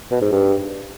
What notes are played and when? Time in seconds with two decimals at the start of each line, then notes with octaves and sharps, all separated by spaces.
0.12 B2
0.22 G#2
0.32 G2